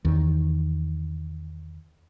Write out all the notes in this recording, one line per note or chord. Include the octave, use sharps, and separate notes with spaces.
E2 D#3